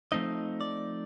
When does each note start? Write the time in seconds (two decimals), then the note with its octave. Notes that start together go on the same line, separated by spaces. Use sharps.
0.12 F3 A3 C4 D#4 D#5
0.61 D5